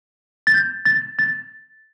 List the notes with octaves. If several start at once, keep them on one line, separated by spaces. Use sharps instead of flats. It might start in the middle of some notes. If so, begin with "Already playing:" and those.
A6
G6
A6
A6